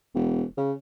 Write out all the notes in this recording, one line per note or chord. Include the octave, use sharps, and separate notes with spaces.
E1
C#3